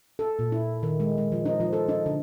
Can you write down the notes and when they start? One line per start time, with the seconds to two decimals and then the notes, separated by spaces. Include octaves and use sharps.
0.19 A4
0.39 A#2
0.52 E4
0.83 D#3
1.00 G#3
1.18 G#3
1.32 F3
1.45 D#4
1.60 F3
1.73 A4
1.89 D#4
2.06 D3